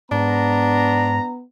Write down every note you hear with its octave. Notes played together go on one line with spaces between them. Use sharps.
G#2 B3 D4 A#5